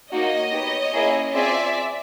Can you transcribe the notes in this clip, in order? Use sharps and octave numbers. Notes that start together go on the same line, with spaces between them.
A#3 D#4 F#4 C#5 D#5
B3 D#4 G4
A#3 C#4 E4 G#4
C4 F4 G#4 D5 E5